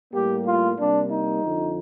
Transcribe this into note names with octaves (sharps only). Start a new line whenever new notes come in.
A2 G3 A#3 G4
F4
C3 G3 A#3 D4
D#4
F2 D3 F3